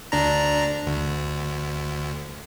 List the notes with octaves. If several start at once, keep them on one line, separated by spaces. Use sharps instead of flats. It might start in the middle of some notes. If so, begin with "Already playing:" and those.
D2 D4 A#5
D2